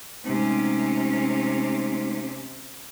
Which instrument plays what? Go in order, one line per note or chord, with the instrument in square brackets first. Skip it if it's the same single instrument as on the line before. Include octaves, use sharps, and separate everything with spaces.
[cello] C3 C#4 [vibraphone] G#3 A3 D#4